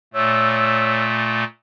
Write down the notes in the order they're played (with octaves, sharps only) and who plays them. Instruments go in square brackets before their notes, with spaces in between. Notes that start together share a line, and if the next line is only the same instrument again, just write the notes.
[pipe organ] A#2 A3 [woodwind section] C#5 E6